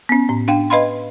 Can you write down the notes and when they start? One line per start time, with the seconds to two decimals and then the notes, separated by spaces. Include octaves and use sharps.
0.09 B3 C#4
0.29 A2
0.48 D4 F5 G5
0.70 B4 D#5 F5 B5 C6